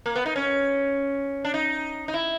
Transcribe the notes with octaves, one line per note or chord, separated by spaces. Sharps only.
A#3
B3
D#4
C#4
D4
D#4
D#4
E4